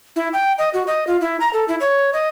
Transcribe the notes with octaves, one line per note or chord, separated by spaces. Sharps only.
E4
G5
D#5
F#4
D#5
F4
E4
A#5
A4
E4
C#5
D#5